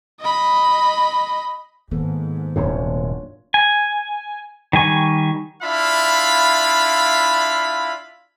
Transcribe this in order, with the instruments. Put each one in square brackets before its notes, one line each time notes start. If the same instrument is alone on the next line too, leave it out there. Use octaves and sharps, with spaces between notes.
[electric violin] D#5 B5
[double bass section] G#2 [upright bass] D#3 [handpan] A#3 B3 A4
[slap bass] D#1 F#2 C3 [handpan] D4 F4 C#5
[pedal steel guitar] G#5
D#3 G3 G#5 C#6
[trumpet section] D4 E4 F4 E5 F5 B5